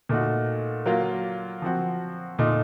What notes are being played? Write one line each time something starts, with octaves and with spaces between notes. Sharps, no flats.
A#2 A3 D#4 F#4
F#3 A#3 F4
F3 C4 F#4
A#2 A3 D#4